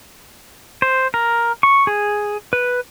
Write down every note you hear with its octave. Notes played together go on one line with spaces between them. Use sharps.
C5
A#4
C#6
G#4
B4